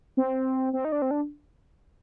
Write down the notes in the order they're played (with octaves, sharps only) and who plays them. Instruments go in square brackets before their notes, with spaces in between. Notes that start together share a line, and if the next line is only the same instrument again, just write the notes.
[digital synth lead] C4
C4
D#4
D4
C4
D4